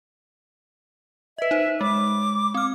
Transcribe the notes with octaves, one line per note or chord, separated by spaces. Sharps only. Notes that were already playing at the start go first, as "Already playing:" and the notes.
B4 D#5 E5
D#4 C5
G#3 D6
C4 F6